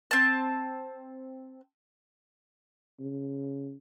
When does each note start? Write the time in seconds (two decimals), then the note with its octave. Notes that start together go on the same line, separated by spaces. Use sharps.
0.11 C4 A5
3.00 C#3